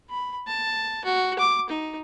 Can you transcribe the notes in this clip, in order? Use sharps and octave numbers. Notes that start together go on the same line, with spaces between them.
B5
A5
F#4
D6
D#4